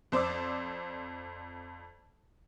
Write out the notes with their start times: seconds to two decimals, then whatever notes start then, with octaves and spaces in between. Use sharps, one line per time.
0.12 F2 C5 D5 D6 E6